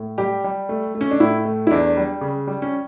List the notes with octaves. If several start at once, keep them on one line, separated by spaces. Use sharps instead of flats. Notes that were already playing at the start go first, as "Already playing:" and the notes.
Already playing: A2
G3 G4
G3
A3
A3
C#4
D4
A2 E4
A3
E4
E2 D4
G3
C#3
G3
C#4